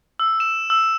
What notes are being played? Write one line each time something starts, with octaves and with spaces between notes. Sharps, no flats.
E6
E7
E6